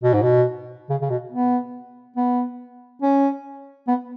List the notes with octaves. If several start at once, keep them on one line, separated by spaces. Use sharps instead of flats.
B2
G#2
B2
C#3
C#3
B2
B3
B3
C#4
B3